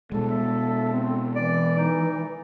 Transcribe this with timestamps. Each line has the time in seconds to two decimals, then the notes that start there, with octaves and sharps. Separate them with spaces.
0.12 B2 G#3 A4
0.31 E5
0.92 C4
1.36 E3 D5
1.78 D#4